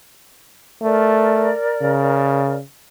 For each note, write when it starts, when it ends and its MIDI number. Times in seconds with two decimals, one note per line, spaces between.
0.82 1.51 57
0.82 2.55 70
0.82 2.55 74
1.82 2.62 49